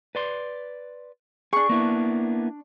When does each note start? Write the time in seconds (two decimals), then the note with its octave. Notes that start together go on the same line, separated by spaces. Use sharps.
0.15 B4 D5 C6
1.53 D4 G#4 C#6
1.69 A#3 B3 E4